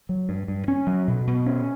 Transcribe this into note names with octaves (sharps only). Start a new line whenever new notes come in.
F#3
G2
G2
C#4
F#3
B2
B2
C#4